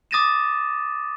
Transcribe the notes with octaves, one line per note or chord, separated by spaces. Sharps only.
D6 D#6 A6 A#6 D#7 E7